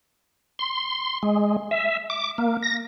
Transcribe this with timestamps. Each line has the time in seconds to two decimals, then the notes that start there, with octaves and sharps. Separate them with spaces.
0.59 C6
1.23 G#3
1.71 E5
2.10 D6
2.38 A#3
2.63 A#6